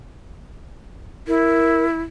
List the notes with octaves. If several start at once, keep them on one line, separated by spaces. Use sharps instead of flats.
E4 A#4